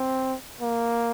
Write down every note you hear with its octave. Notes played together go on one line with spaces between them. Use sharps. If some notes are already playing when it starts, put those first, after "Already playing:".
Already playing: C4
A#3